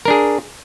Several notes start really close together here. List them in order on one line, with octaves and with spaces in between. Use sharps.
A#4 D4 G#4